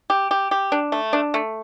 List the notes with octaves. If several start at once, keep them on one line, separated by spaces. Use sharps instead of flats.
G4
G4
G4
D4
A3
D4
A3